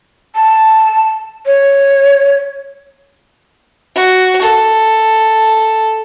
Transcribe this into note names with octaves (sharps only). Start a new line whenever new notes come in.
A5
C#5
F#4
A4